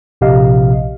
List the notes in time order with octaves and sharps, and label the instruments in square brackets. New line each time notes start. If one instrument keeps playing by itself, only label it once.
[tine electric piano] A#1 C3 G4 D#5 F5